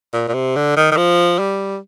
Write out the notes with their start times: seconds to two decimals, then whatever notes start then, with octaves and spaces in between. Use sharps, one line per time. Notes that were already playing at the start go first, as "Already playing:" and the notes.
0.13 A#2
0.28 A#2
0.34 C3
0.56 D3
0.76 D#3
0.92 D#3
0.97 F3
1.39 G3